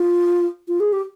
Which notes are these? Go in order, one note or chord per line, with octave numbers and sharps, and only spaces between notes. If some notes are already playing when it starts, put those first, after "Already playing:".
Already playing: F4
F4
G#4
G4